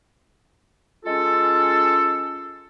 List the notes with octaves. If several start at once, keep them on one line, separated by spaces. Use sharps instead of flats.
G#3 C#4 F4 A4